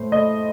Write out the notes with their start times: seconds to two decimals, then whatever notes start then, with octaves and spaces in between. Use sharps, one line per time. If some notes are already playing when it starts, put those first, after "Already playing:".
Already playing: A2 A3 C5
0.12 A3 D#5